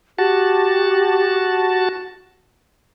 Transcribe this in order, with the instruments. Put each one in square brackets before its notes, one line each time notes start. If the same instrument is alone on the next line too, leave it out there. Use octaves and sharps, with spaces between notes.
[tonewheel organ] F#4 A5 [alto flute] G4